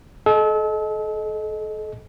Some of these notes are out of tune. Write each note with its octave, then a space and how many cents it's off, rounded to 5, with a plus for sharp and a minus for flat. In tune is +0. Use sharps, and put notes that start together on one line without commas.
A4 -35 D#5 +0